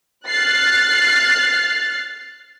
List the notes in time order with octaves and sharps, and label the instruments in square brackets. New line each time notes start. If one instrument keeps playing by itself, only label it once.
[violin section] F6 F#6 A6 C7